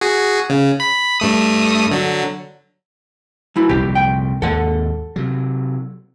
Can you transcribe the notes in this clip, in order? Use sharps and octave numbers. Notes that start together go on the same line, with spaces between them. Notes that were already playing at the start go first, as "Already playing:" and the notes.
F#4 G#4
C#3
B5
G2 A3 D#6
D3 F#3
F#3 E4
F1 C2 A#2 G4
G5
D#2 G#2 A#3 A4 F#5
C3 F#3